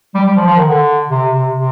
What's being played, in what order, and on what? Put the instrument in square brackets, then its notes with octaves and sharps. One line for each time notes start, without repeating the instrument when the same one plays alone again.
[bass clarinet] G3
G3
F3
F3
D#3
D3
C3
C3
C3